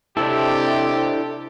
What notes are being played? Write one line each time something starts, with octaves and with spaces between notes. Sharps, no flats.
C3 D4 E4 G4 A4